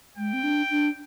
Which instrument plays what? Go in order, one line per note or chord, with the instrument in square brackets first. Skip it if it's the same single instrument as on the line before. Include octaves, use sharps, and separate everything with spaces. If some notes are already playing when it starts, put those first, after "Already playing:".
[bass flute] G#3 [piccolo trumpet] G5
[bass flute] C4
D4
D4